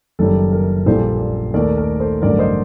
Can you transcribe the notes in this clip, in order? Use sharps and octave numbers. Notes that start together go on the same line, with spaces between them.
F#1 F#2 D#3 G3 A4
A#4
A#1 A#2 G3 A#3 A4 C5
D#2 D#3 A3 A#4 D5
A#4
A4 C5
A1 G2 D3 F#3 A3 A#4 D5
C5 D#5